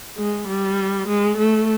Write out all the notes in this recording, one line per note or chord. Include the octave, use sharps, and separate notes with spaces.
G#3
G3
G#3
A3